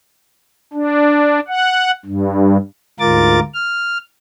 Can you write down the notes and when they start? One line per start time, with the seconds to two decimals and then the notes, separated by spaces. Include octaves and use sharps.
0.73 D4
1.48 F#5
2.05 G2
3.00 D2 G#2 F4 A#4 D6 A6
3.54 F6